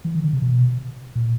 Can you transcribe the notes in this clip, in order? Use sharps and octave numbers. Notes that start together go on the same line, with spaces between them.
E3
D#3
D3
C3
B2
A#2